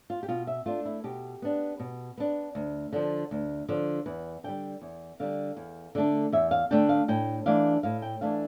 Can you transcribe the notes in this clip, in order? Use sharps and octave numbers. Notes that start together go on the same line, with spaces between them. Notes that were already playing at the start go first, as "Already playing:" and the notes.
F4
G4
B2 F4
E5
A3 D4 F4
E4
B2 G4
B3 D4
B2
B3 D4
D2
D3 F3
D2
D3 F3
E2 B4
D3 G3 G5
E2
D3 G3 F5
E2
D3 A3 D4
E2 E5
F5
D3 A3 D4 G5
F5
A2 G5
E3 A3 D4 F5
A2 F5
G5
E3 A3 D4 F5